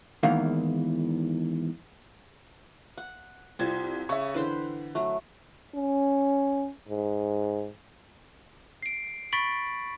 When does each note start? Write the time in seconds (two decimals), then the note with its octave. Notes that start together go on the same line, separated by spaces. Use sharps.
0.23 E2 G#2 D#3 E3 A#3 F5
2.98 F#5
3.59 C2 C4 F4 A4 G#6
4.09 C#3 E5 C#6
4.34 D3 E3 B4 C5 G5
4.95 F#3 A3
5.75 C#4
6.88 G#2
8.83 C7 D7
9.33 B5 C#6 A6 B6 D7 F#7